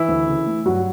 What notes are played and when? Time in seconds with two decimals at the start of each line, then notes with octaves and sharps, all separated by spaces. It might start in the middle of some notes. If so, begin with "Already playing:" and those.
Already playing: E3 E4
0.09 D2
0.28 C#3
0.46 A3
0.65 G2 F#3 F#4